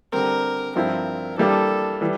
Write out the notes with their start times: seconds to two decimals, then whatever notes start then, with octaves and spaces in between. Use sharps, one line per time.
0.12 D3 G3 C4 A#4
0.75 G2 F3 C4 E4 A#4
1.38 E3 G3 A#3 D4 A4
2.01 E3 G3